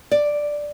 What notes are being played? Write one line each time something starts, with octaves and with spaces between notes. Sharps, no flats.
D5